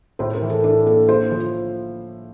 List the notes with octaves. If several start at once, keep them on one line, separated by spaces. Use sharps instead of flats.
A2 C5
A#4
E3
A4
D4 A4
A#3 A4
A#3 C5
F3